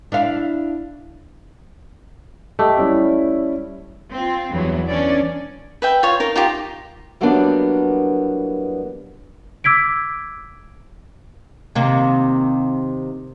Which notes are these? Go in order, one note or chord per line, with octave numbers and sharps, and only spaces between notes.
D4 E4 F5
A3 G4 D#5
G3 C#4 E4
C4 F4
E2 G2 E3 F#3 B3
E3 C#4 D4 D5
B4 E5 G5
F4 C#5 F5
D#4 A#4 F5
D#4 F4 G4
E3 F#3 G3 A#3 B3 D4
D6 E6 G#6 B6 D7
C3 D#3 A#3